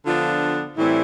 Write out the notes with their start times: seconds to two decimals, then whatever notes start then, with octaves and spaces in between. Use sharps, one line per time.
0.05 D3 F3 B3 D4 F4
0.76 A2 E3 G3 C4 E4